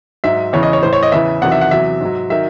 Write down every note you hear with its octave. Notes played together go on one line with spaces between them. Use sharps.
G#2 F#3 E5
E2 C#3 E3 C#5
D#5
C#5
A2 E3 C5
C#5
D#5
E2 C#3 E3 E5
E2 C3 D#3 F#3 F#5
E5
F#5
E2 C3 F#3 E5
G#2 F#3
D#3 F#3 E5